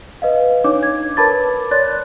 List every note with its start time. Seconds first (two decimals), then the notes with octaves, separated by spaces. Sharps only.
0.22 B4 D#5 F5
0.64 D4 D#4 C#5 D6
0.82 C#5 G#6
1.17 A#4 B4 A5 B5 D6 A6
1.71 C#5 D5 C6 F#6 A6